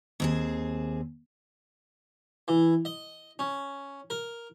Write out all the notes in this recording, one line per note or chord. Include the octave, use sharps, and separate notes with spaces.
D#2 C4 G#4
E3
D#5
C#4
A#4